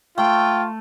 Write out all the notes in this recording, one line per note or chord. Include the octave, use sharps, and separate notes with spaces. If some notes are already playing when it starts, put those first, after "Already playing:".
A3 F4 G5